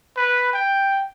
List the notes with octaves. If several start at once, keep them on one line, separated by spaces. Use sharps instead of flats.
B4
G5